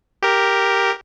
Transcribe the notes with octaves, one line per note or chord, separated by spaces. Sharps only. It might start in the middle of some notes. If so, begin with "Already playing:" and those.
G4 A#4